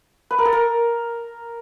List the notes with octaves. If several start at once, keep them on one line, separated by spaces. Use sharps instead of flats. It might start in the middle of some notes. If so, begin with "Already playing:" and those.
B4
A#4
A4
A#4